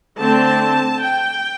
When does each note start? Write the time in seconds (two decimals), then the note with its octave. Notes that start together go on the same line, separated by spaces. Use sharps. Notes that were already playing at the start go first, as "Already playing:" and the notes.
0.19 D3 A3 C4 A5
1.01 G5